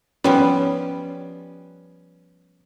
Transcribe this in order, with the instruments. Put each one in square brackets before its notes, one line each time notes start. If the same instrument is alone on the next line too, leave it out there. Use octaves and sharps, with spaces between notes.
[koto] F3 G3 B3 [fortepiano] C#4